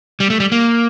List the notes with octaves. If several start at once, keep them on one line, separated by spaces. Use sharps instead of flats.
G3
A3
G3
A#3